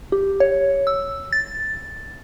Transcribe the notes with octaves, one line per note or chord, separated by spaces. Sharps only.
G4
C#5
E6
A6